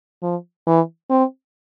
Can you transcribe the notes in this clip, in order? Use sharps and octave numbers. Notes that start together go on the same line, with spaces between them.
F3
E3
C4